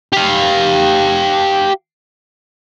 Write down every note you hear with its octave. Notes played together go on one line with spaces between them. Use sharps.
G4 F5